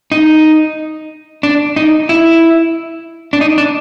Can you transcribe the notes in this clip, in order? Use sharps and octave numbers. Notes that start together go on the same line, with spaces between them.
D#4
D4
D#4
E4
D4
D#4
D4